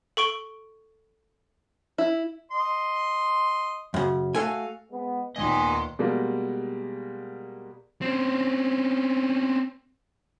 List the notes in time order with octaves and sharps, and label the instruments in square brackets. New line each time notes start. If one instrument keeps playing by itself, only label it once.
[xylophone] A4 C#6 D7 G7
[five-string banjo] E4
[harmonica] D#5 C6
[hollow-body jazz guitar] F#2 C#3
[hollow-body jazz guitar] A3 A4 G#5 [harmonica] F#4 F5
[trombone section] G#3 B3
[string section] D#2 A#2 D#3 [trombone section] B3 [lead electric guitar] D#5 C6 [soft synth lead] G#5
[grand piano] B2 G3 G#3 A#3
[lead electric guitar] C4 C#4